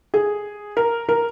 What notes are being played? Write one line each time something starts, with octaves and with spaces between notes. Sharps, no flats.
G#4
A#4
A#4